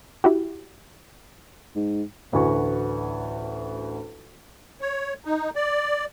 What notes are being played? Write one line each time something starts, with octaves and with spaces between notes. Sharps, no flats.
E4 F#4 G4
G#2
A1 D2 F#4 B4 G#5 C#6
C#5
D#4
D5